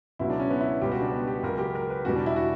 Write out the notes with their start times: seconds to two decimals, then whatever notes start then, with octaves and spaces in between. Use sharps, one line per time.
0.19 C#2 B2 F#3 E4
0.30 D4
0.40 C#4
0.50 B3
0.61 E4
0.81 C#2 B2 G3 G4
0.92 F#4
1.02 D4
1.12 B3
1.27 G4
1.43 C#2 C#3 F#3 A#4
1.59 G4
1.75 A#4
1.90 B4
2.05 E2 B2 G3 F#4
2.16 D4
2.26 E4
2.36 F#4